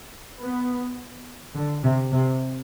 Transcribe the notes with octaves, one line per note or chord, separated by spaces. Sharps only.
B3
D3
C3
C3